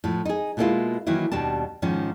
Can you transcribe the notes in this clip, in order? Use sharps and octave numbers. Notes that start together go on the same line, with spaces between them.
A2 F3
D#4 G#4
B2 G#3 A#3 C#4 E4 F4
D#3 E3 F#3 A#3 E4
D#2 B2 G3 D4 A5
G#2 D#3 F3 C#4